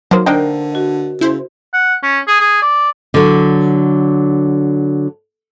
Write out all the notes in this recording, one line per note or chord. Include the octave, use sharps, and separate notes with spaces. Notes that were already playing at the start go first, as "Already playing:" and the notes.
D#3 F#3 A#3 C5
D3 A#3 D4 D#4 A#4 C5 G5
F#4 D#5
C#3 E4 C5
F#5
C#4
G#4
G#4
D5
D3 F#3